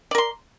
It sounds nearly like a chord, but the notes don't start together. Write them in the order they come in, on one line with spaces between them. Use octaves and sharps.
D5 A#4 C6